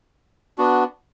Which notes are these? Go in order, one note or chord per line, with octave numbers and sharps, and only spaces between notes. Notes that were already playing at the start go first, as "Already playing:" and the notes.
B3 D4 F#4